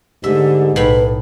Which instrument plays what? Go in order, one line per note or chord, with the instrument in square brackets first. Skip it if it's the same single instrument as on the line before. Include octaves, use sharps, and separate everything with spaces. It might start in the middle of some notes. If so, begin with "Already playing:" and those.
[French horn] G#2 [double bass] D3 A3 [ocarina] G4 [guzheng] E5
[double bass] B1 [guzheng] A2 B5 [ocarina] B4